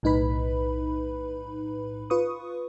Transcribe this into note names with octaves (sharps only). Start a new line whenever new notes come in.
B1 A2 D#4 B4 B5
F4 B4 C#6 D#6